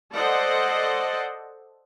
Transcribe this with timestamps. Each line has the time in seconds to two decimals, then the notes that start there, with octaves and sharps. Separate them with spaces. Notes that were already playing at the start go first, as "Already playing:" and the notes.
0.14 A4 C5 D5 D#5 F#5